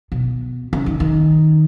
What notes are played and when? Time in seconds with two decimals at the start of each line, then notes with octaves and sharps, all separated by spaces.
0.12 B2
0.73 C#3
0.86 D#3
1.00 D#3